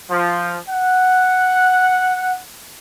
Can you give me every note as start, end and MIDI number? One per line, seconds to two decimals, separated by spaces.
0.11 0.56 53
0.69 2.38 78